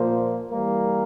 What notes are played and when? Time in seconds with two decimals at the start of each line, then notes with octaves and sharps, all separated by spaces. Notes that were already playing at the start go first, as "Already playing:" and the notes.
Already playing: A#2 F3 A#3 C5
0.51 E3 G3 A#3 A#4